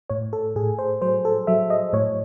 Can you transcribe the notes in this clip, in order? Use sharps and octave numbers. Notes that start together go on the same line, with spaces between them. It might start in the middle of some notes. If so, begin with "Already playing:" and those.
A2 C#5
A4
A2 G#4
C5
F#3 C5
A4
F#3 E5
D#5
A2 C#5